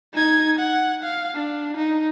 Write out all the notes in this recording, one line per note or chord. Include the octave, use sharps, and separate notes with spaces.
D#4 G#6
F#5
F5
D4
D#4